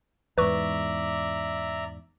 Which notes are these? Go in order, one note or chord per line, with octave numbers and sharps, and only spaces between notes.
E2 G#2 B4 D5 E5 A#5 C#6